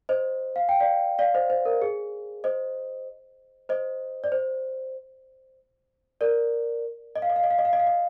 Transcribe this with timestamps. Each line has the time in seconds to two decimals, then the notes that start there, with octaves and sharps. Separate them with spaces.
0.09 C5 D#5
0.56 F5
0.69 G5
0.80 D5 F5
1.19 D5 F5
1.34 C5 D#5
1.50 C5
1.65 A#4
1.82 G#4
2.44 C5 D#5
3.69 C5 D#5
4.24 D5
4.32 C5
6.21 A#4 D5
7.16 D#5
7.22 F5
7.30 D#5
7.36 F5
7.43 D#5
7.51 F5
7.58 D#5
7.65 F5
7.73 D#5
7.80 F5
7.87 D#5